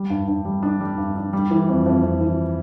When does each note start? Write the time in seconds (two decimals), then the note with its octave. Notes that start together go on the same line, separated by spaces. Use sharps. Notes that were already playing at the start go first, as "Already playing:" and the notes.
Already playing: G3
0.10 G2
0.28 G2
0.45 G3
0.63 D4
0.81 G3
0.98 G2
1.16 D4
1.33 G3
1.51 E3
1.69 F2
1.86 F2
2.03 F2
2.21 E3